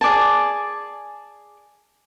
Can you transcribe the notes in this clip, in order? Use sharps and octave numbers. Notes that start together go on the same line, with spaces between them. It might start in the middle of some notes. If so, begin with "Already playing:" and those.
G#4 D5 G#5 A5